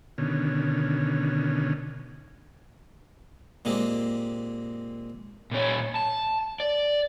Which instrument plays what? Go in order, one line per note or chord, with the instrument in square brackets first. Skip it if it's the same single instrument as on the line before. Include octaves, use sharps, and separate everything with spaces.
[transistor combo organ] B2 D3 D#3 C#4
[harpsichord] A#2 G#3 A#3 C4 G4
[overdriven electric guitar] A#2 C#4
A5
D5